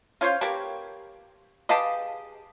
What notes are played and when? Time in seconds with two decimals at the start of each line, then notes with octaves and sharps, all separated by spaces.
0.21 C#4 F4 C5 C#5 F5
0.41 A#3 G4 A#4 B4 C#5 A5
1.69 G4 G#4 B4 D#5 F5 A5